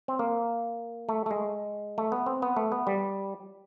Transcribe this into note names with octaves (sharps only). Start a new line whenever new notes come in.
C4
A#3
A3
A3
G#3
A3
B3
C4
B3
A3
B3
G3